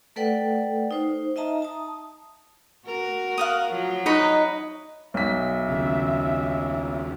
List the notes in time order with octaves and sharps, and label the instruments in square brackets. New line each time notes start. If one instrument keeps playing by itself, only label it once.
[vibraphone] A3 A4 B4 D5 F#5 G5
D#4 C5
D#4 D#5 E5 A5 A#5
A5 D#6
[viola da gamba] F#4 A#4
[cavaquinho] F5 F#5 D#6
[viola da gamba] F3 F#3
[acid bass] D#4 [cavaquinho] B4 C#5 D#5
[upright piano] B1 B6 [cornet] E5
[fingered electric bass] D#2 C#3